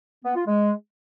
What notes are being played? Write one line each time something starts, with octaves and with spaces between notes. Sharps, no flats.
B3
F4
G#3